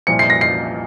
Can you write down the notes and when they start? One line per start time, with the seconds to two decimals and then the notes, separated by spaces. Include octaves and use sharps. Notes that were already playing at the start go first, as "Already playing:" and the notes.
0.07 C2 A#2 F3 C#7
0.19 C7
0.30 A#6
0.41 C7